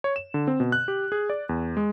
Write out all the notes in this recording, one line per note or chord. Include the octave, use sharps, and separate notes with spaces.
C#5
E7
D3
C4
B2
F#6
G4
G#4
D5
E2
G#3